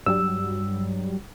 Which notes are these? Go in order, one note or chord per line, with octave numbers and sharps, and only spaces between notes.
G2 F#3 G3 E6